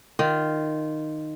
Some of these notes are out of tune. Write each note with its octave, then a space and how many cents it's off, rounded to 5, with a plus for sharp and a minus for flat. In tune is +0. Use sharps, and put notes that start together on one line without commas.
D#3 -10 F4 +0